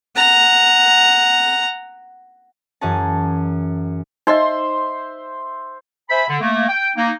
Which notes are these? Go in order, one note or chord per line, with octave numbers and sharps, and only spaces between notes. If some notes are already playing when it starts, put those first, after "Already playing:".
F#5 A#5
F#2 E3 C#4 F#4 G#4 A5
D#4 C5 D#5 E5 C6
C5 E5 G#5 B5
D3
A3 A#3
G5
A#3 D#4